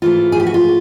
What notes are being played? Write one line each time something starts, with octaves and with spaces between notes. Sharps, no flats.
G#2 E3 A3 F4
G#4
G4
F#4
F4